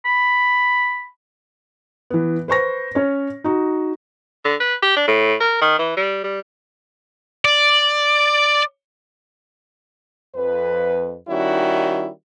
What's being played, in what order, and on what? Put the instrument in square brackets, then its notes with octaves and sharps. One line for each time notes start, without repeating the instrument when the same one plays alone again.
[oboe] B5
[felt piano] E3 B3
B4 C5 C#6 A#6
C#4 C#5
D#4 F#4
[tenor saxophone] D3
B4
G4
D4
A2
A#4
D#3
E3
G3
G3
[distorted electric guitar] D5
[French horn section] F2 B4
D#3 G3 C#4 D#4 E4 F#4